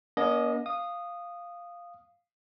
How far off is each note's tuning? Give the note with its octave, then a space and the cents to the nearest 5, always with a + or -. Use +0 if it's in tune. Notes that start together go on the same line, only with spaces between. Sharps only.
A#3 +45 C#4 +45 D#5 +0
F5 +0 D#6 -10